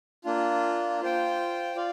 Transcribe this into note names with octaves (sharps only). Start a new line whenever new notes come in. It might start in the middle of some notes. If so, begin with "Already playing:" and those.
A#3 D4 F4
F4 C5 G5
F4 D5 F5